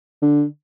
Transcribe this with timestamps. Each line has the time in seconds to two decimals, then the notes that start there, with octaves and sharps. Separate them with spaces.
0.22 D3